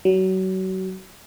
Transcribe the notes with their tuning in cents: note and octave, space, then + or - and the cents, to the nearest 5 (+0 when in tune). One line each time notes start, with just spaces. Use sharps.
F#3 +30